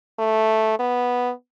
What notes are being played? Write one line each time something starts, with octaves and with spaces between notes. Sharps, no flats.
A3
B3